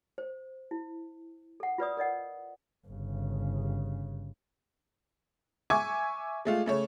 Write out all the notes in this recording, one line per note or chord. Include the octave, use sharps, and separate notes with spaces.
C5
E4
A4 F#5
F4 B4 D5 D#6
A#4 D5 D#5 F#5
G1 C#3
E5 G#5 C#6 D6 G#6
G#3 A3 F4
C#3 A3 C#5